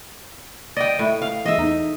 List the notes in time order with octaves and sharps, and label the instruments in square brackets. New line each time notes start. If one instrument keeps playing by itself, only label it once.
[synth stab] D5 [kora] D#5 G5
[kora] A2 [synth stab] E4
[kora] F5
[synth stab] E3 G#3 [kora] D#5 E5
[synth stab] E2 D#4